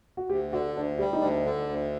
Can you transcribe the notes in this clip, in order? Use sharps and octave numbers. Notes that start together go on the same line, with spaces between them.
F#4
D2 G4
D3 F#4
D2 D4
G3 G4
D#4
D2 D4
D3
D2